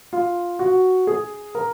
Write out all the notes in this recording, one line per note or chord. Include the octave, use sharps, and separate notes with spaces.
F4
F#4
G#4
A#4